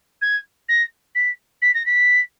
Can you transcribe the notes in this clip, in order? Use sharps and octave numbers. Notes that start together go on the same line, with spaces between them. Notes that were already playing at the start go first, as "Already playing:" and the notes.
G#6
A#6
B6
B6
A#6
B6